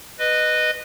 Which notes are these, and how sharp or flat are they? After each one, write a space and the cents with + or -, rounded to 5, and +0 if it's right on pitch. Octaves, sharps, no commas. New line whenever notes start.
B4 +0 D#5 -15